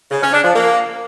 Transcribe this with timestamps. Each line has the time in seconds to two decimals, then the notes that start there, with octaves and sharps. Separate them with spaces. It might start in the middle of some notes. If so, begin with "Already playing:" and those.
0.11 C#3
0.22 C#4
0.33 D4
0.44 F3
0.55 A#3